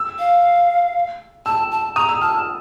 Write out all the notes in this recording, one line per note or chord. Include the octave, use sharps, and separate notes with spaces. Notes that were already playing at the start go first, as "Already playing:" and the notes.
Already playing: E6
F5
A5 E6
A5
A#5 D#6
E6
A5 F6
E6